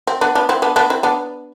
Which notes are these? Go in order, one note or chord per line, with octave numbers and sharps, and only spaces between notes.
C4
B3 D4
B3 D4
C4 E4
B3 D4
B3 D4
C4 E4
B3 D4